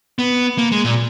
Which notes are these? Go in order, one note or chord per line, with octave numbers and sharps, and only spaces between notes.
B3
A#3
G#3
A#2